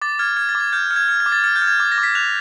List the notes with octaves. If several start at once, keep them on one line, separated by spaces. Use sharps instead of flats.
D6 A6
F6 G#6
F6 G#6
A6
D6
G#6
F6 G6
F6
G#6
F6
G#6
D6
A6
F6 A6
G6
F6
G#6
D6 G#6
A#6
D6
B6
F#6 F7